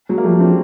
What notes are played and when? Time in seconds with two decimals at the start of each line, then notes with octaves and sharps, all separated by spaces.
0.09 F#3 G#3
0.18 A#3
0.24 F3 G3 A3
0.40 C4 D4